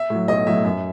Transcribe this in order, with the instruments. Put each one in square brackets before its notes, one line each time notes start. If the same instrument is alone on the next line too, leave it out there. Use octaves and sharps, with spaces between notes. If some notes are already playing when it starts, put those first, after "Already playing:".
Already playing: [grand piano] E5
[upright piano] A2 F#3
[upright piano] B1 [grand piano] D#5
[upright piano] A2 F#3 [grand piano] E5
[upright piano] F#2 [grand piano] E5